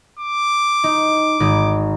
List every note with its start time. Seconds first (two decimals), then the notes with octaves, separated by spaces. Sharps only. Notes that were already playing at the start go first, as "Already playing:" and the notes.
0.19 D6
0.84 D#4
1.40 G#1 D#4